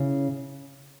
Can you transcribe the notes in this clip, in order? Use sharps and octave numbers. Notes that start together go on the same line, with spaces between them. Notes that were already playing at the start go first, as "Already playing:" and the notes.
Already playing: C#3 E4